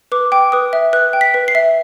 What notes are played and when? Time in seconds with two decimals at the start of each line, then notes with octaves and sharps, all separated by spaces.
0.12 B4 D6
0.32 G5 D6
0.52 B4 D#6
0.73 E5
0.93 B4 F#6
1.13 G5
1.21 B6
1.34 B4
1.48 C7
1.55 E5